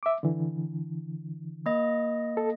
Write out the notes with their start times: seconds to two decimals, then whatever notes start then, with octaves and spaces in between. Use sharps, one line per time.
0.03 E5 D6
0.23 D3 E3
1.66 A#3 D#5
2.37 A4